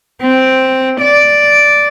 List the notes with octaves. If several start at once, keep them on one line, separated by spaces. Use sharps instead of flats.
C4
D5